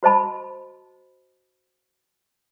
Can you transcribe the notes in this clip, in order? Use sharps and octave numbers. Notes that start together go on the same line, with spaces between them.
F#4 C5 D#5 A5 B5